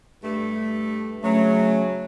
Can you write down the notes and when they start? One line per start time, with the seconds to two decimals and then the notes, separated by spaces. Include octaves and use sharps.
0.23 G2 A3
1.22 C#3 F#3 A3 C#4